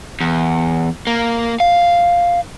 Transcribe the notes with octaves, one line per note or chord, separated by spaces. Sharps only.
E2
A#3
F5